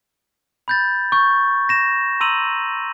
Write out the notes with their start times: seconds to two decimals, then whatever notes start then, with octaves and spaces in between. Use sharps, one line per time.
0.68 B5 G6 A6
1.12 C#6 G6
1.69 A#6 E7
2.20 A#5 C6 E6 D#7 F7 F#7